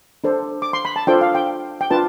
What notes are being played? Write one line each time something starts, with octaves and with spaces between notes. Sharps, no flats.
D4 A4 C5
D6
C6
B5
A5
D4 F4 A4 C5 G5
F5
G5
G5
D4 F4 B4 A5